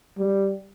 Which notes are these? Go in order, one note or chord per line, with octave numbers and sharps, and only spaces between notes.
G3